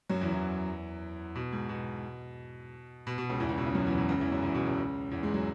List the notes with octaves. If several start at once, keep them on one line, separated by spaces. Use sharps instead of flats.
F#2 F#3
E2 E3
E2 E3
B2
G#2
B2
B2
B2
C#2 C#3
E2 E3
C#2 C#3
B2
C#2 C#3
F#2 F#3
E2 E3
B2
C#2 C#3
E2 E3
F#2 F#3
E2 E3
B2
C#2 C#3
E2 E3
G#2 G#3
F#3